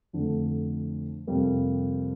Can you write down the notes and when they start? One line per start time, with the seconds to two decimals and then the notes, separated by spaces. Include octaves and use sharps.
0.13 F2 D3 A3
1.27 F2 C3 G3 A#3